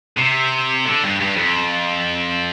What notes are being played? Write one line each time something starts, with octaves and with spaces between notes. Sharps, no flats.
C3
D3
G2
G2
F2